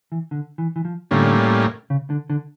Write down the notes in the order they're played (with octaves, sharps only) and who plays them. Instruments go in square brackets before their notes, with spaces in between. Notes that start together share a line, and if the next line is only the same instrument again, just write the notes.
[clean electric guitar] E3
D3
E3
E3
F3
[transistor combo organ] A2 G3 A#3 C#4 [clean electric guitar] D3
[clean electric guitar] C#3
D3
D3